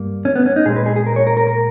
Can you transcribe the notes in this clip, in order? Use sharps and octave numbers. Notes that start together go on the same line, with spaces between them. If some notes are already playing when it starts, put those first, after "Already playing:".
Already playing: G2 G3 A#3
C#4
B3
C#4
D#4
A#2 G#3 G#4
B4
G#4
G#4
A#4
C#5
A#4
A#4
A#4